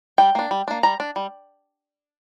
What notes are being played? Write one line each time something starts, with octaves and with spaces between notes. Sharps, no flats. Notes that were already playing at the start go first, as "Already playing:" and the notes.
G3 G5
A#3 D4
G3
A#3 D4
G3 A#5
D4
G3